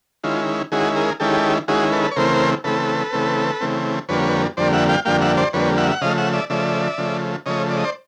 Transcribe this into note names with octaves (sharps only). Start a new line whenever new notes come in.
D#3 G#3 C#4 E4 F4
D#3 G#3 C#4 E4 F#4 G#4
G#4 A#4
D#3 G#3 C#4 E4 G4 A4
D#3 G#3 C#4 E4 F#4 G#4
A4 B4
C#5
C#3 E3 A3 C4 A#4 C5
C#3 E3 A3 C4 A4 B4
C#3 E3 A3 C4
C#3 E3 A3 C4
F2 D3 G3 A#3 B4 C#5
F2 D3 G3 A#3 C5 D5
E5 F#5
F5 G5
F2 D3 G3 A#3 F5 G5
E5 F#5
C5 D5
F2 D3 G3 A#3 B4 C#5
E5 F#5
F#5
C#3 F3 A3 D#5 F5
E5 F#5
D5 E5
C#3 F3 A3 D5 E5
C#3 F3 A3
C#3 F3 A3 C#5 D#5
D5
D#5
C5 D5